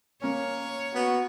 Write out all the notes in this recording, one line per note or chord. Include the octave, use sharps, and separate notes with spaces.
A#3 C#4 C#5
B3 F#4